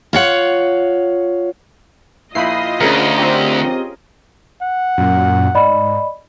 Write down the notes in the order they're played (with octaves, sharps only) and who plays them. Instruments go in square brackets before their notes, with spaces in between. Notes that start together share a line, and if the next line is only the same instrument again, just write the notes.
[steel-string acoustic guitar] F4 C#5 F#5
[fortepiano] A#1 E4 [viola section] F4 D#5 [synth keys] B5 C7
[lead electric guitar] D2 [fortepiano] C#4 G#4 A#4
[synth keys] C4 G4
[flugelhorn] F#5
[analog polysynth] F#2 A#2
[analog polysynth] G#2 [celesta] D5 D#5 B5